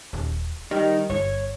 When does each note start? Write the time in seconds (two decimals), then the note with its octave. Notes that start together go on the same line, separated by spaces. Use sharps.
0.13 D#1
0.71 G3 D#4 A#4 D#5
1.10 G1 C#5